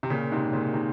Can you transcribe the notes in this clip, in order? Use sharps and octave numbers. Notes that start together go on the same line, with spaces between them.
C3
A#2 C#3
G#2 C3
A#2 C#3
C3 D#3